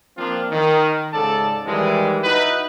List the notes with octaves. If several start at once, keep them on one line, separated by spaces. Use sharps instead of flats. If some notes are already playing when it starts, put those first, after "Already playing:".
F3 A#3 C4 D4 F4
D#3
G#2 C#3 A4 D5 A5
D#3 E3 G3 G#3
D#4 E4 F#4 B4